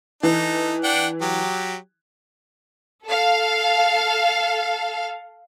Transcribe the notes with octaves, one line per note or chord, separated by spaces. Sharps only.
E3 D#4 A4
D4 F#5 G5
F#3 G4
A4 F5